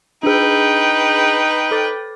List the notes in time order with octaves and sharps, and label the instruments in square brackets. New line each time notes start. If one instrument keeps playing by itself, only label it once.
[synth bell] D4 G#4 [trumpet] D#4 [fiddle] B4 G5
[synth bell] A4 D6 A6